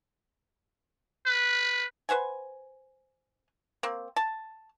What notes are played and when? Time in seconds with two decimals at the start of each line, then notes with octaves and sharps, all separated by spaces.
1.27 B4
2.09 B4 C5 F#5 G#5
3.83 A#3 C4
4.16 A5